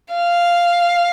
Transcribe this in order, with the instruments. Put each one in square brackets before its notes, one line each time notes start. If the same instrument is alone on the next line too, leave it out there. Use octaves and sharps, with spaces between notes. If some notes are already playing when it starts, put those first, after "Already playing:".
[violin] F5